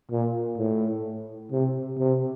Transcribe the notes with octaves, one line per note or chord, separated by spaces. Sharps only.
A#2
A2
C3
C3